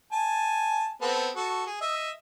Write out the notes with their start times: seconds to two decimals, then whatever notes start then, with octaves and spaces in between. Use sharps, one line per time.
0.12 G#5 A5
1.02 B3 C4 A4
1.35 F#4 A4
1.67 G#4
1.81 D#5 E5